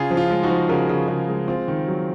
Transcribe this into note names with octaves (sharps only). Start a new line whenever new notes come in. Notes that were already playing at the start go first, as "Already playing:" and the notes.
Already playing: C#3 F4 G#4
F3
F4
G#3
D#4 F#4
F3
C#3 F#4 A#4
C#3
C#3
G#3
C4 F4
D#3
F#3